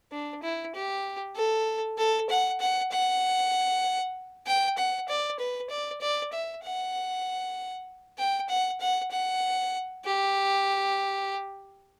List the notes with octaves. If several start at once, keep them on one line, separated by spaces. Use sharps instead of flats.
D4
E4
G4
A4
A4
F#5
F#5
F#5
G5
F#5
D5
B4
D5
D5
E5
F#5
G5
F#5
F#5
F#5
G4